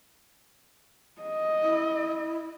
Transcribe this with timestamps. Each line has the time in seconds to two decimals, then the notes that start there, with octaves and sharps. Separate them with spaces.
1.22 D#5
1.64 E4